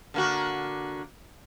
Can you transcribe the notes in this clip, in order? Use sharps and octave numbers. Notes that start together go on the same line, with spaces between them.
D3 A#3 F#4